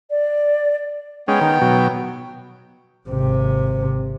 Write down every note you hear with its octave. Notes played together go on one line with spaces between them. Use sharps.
D5
G#3 B3 C#4 G5
D#3
B2 F#3
G#1 C3